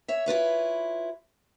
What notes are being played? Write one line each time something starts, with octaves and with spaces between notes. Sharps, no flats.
C#5 E5
E4 F4 B4 C#5